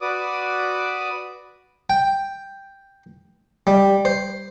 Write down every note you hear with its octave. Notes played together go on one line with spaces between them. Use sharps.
F#4 B4 D5 D6 D#6
G5
G3
C5